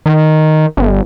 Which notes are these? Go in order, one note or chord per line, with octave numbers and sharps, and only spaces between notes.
D#3
G1